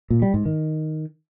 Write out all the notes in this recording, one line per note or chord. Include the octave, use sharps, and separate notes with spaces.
A#2
G3
G#2
D#3